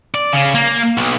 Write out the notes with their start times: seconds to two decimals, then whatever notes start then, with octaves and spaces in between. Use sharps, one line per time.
0.14 D5
0.33 C#3
0.55 A#3
0.97 B1